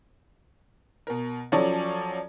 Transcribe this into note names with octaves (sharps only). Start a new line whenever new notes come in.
B2 A#4
F3 F#3 C#4 A4 C#5 D5